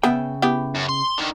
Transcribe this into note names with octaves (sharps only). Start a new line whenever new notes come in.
C#3 B3 E5 G5
B3 E4 G4
F#2
C6
D3 D#3